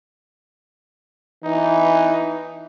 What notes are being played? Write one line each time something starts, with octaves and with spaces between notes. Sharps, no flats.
E3 D#4